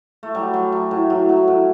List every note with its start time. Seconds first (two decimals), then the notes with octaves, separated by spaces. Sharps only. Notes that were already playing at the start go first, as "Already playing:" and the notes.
0.23 A3
0.35 F#3 G3
0.54 F#3
0.72 F#3
0.91 A2
1.10 A2 F#3
1.29 F#3
1.48 A2